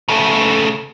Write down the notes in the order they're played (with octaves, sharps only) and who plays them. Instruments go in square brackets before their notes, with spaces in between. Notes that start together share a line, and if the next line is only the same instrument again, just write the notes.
[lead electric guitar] C#3 A3